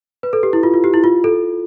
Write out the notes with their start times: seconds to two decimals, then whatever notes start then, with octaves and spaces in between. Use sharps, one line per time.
0.23 B4
0.33 A4
0.43 G4
0.53 E4
0.63 F4
0.74 F4
0.84 G4
0.94 E4
1.04 F4
1.24 A4